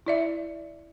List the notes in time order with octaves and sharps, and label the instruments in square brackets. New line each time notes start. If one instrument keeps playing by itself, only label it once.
[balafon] E4 D5 E5